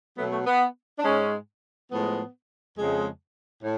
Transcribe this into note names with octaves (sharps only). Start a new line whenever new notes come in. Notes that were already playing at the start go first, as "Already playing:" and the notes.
B2 F#3 A3 B3
A3
B3
D4
G#2 G#3 C#4
A2 F3 G#3 B3
F2 C#3 G#3
A2